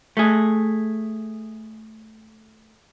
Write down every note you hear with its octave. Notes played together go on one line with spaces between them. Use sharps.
A3 G#4